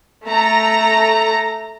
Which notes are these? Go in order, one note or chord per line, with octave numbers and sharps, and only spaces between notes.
A3 A#5